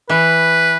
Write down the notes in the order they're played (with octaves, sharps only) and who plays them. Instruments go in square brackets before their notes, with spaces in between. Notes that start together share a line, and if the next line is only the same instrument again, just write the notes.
[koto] E3 [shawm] B4